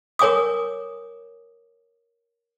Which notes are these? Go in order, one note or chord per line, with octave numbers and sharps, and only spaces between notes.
A#4 C#5 G#5 D6 D#6